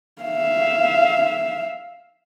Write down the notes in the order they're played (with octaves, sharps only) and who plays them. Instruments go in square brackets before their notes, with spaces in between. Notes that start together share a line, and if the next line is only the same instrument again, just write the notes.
[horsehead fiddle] E5 F5